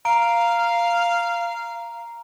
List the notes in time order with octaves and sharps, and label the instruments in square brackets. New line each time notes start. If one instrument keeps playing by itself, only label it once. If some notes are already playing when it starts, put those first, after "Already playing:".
[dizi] F5 [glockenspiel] A#5 D7